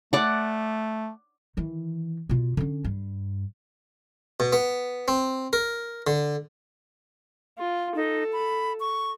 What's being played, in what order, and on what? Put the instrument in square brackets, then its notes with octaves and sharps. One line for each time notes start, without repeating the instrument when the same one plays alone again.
[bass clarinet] A3 [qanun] D5 F#5
[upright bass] D#3 E3
B2 F4
D3 C#4
G2
[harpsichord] B2
B3
C4
A#4
D3
[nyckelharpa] F4
[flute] D#4 [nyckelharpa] A4
[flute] B5
C#6